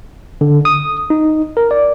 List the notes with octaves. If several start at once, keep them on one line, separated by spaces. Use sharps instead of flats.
D3
D#6
D#4
A#4
D5